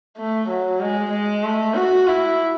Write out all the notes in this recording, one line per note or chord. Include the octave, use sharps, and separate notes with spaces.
A3
F#3
G#3
G#3
A3
F#4
E4